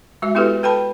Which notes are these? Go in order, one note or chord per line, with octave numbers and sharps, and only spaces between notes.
G#3 F#4 E5
B3 E4 F#4 G4 A4 B4
A4 B4 G5 A5 B5